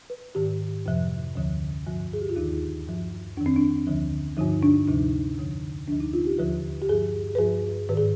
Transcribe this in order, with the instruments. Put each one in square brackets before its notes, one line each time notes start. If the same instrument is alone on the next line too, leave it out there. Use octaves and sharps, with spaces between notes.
[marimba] B4
G#2 D#3 G4
F2 C3 F3
D2 D3 F3
G2 F3
G#4
G4
F4
D#2 D#3 D#4
G2 F3
F2 D#3 D4
C4
D4
D2 D3 F3
G2 D3 F3 D#4
D4
D2 C3 F3 D#4
F2 D3 F3
D2 D3 F3 D4
D#4
F4
G4
D#2 D3 F3 B4
G4
G2 F3 G#4
B4
G2 F3 G#4
G#2 D#3 B4
G#4